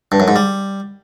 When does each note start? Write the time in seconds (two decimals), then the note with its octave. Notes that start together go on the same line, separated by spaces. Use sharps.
0.12 G2
0.20 F#2
0.28 G#2
0.36 G3